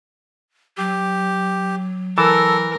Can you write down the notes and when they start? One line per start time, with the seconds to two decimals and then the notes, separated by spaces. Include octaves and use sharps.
0.78 F#3 G4
2.18 E3 A4 A#4 A5